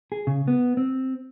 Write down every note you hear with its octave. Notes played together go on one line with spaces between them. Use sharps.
G#4
C#3
B3
C4